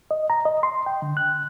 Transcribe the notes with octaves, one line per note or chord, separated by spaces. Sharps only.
D#5
A#5
D#5
C6
G5
D3
F#6